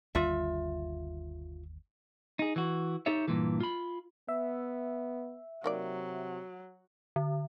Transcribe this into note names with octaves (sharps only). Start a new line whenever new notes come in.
G1 D#2 G3 F4 E5
D#4 G#4
E3 F#4
D#4 G4 A4 C#5 E5
G2 A#2 E3
F4 B5
B3 E5
C3 D#3 F#3 A#3 D5
D3